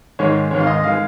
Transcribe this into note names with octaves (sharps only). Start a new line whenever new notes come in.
G#2 D#3 G#3 C#5
G#2 D#3 G#3 C#5
F5
D#5
D#3 G#3 F5